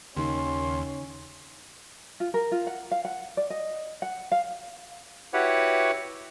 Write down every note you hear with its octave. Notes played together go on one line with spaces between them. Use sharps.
D#2 C#3 C#4 D#4 C6
F4
A#4
F4
F#5
F5
F#5
D5
D#5
F#5
F5
E4 F#4 G4 B4 C#5 F#5